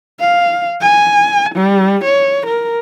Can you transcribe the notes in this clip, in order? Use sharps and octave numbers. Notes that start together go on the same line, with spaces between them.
F5
G#5
G3
C#5
A#4